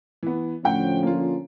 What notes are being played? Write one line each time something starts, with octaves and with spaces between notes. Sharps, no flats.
E3 B3
A2 D3 F3 C#4 F#5 G5
A#3 F4